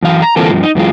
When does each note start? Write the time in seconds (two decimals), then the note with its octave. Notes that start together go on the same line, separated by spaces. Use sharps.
0.02 F#2 E3 F5
0.22 A#5
0.36 D3 E3 A#3 C4 F4 A4
0.50 G2 F3
0.63 D#4
0.75 F#2 E3 G#3 F4